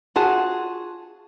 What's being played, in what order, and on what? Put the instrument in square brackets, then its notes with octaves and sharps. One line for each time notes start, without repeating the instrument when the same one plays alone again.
[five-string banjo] F4 F#4 G#4 A5